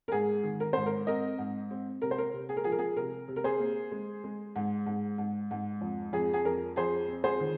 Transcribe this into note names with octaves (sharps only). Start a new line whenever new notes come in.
A#4
G#2 G#4
D#3
A#4
G#2 C5
A#4
C4 A#4 D#5
G#2
C4
C3 A#4
C5
A#4
C3
G#4
A#4
F3 G#4
A#4
G#4
C3 A#4
C3
A#4
G#4 C5
A#3
G#3
G#3
G#2
G#2
G#2
G#2
F2
F2 G#4
G#4
F2 A#4
F2 G#4 C5
C4
G#4 C5
D#3